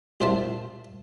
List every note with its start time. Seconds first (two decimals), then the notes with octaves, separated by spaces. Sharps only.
0.20 C2 A#2 C5 E5 F5 A5